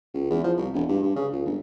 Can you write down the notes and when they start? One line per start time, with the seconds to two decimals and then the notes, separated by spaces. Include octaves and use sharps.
0.14 C#2
0.31 E2
0.44 F3
0.57 C2
0.74 E1
0.89 G2
1.03 G2
1.16 C#3
1.32 C#2
1.45 G1